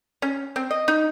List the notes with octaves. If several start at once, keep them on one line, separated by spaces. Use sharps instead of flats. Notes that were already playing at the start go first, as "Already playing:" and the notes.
C#4
C4
D#5
D#4